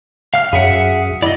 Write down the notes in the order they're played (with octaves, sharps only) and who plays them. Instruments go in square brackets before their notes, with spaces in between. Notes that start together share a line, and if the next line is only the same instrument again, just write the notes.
[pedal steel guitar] F5 F6
[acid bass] F#2 [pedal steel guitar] G#4 E5 F#5
[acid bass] E4 [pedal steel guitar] D5 D#5